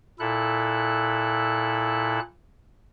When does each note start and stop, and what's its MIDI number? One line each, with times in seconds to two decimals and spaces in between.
0.19 2.20 46
0.19 2.20 64
0.19 2.20 69
0.19 2.20 90